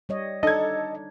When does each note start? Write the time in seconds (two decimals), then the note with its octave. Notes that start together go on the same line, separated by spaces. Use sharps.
0.09 G3 C#5 D#5
0.43 D4 D#4 A4 D#5 G#6